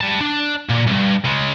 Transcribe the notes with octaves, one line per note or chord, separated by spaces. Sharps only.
G3 A5
D4
A#2
C2 G2
C#3 G#3